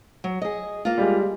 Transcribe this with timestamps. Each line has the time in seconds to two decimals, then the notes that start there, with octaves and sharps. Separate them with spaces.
0.24 F#3
0.42 G#4 D#5
0.85 A#3 F4
0.98 G3 G#3